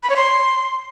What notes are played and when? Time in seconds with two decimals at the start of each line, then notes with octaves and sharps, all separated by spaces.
0.03 B5
0.10 C#5
0.16 C6